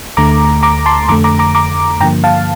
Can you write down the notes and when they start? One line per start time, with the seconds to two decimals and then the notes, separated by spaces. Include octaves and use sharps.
0.17 D2 D3 A3 A#5 D6
0.63 A#5 D6
0.86 A5 C6
1.09 F2 D3 A3 A#5 D6
1.24 A#5 D6
1.39 A#5 D6
1.55 A#5 D6
2.00 G2 D3 F3 A#3 G5 A#5
2.24 F5 A5